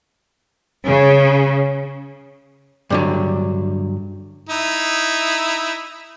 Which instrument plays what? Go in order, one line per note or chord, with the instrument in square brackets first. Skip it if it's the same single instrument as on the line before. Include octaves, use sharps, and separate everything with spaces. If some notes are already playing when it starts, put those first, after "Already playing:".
[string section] C#3
[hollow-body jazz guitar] G2 D3 F#3
[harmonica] D#4 E4